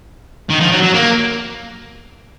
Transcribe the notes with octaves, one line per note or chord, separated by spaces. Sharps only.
D#3
F3
F#3
F#3
A#3